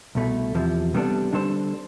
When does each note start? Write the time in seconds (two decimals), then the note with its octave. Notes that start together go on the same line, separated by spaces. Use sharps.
0.15 C2 B2 A3
0.55 E2 C3 F3
0.94 C3 G3 B3 D4 A4
1.33 D3 G3 D4 A4 C5